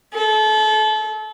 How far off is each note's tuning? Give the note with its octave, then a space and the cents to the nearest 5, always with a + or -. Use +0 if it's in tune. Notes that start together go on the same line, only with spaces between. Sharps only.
A4 -35